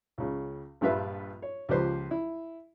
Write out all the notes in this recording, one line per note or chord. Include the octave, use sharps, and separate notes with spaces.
C#2 C#3
A#1 G2 G3 F4 B4 E5
C#5
C#2 F3 G4 B4 C5
E4